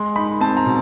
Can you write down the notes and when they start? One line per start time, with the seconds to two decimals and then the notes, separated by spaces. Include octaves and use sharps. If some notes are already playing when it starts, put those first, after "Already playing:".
Already playing: G#3 C6
0.16 D#4 B5
0.41 C4 A5
0.57 A#5
0.66 B2